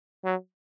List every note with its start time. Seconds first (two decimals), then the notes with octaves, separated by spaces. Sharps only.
0.24 F#3